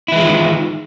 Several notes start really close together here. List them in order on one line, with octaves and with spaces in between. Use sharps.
E4 E3 G#3 F4 D#3